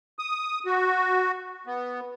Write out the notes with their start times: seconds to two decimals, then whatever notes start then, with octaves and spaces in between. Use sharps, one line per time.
0.19 D#6
0.66 F#4
1.67 B3